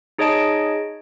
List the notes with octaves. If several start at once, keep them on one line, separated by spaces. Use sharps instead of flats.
D#4 G#4 C#5 D#5 A5 D7